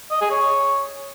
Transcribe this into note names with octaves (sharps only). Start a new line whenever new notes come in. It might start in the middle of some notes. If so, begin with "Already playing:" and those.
D#5
G#4
C#5